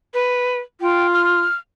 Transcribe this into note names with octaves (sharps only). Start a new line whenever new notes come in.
B4
F4 G5
F6